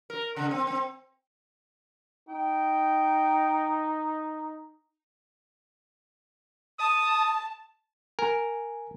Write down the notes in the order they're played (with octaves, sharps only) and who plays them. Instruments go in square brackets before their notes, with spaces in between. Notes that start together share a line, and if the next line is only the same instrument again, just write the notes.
[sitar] A#4
C#3
C4
C4
[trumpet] D#4 [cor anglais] G5
[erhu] A5 [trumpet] D#6
[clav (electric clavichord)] A#4 [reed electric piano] G#5